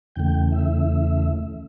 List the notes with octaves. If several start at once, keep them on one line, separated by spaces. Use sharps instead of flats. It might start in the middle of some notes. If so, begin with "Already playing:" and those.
E2 C#3 E3 A3 G5
E5